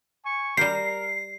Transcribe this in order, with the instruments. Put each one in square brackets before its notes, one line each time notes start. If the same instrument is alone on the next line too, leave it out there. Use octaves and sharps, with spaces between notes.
[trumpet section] G#5 C#6
[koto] G3 G4 [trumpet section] A#4 [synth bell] C7